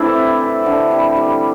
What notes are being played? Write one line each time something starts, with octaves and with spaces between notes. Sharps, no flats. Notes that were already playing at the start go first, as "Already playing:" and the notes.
Already playing: E3 A3 C4 D4 E4
C3
E3
D3
G3
G3